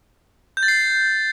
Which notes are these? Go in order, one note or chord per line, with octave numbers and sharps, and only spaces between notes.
G6
A6
C7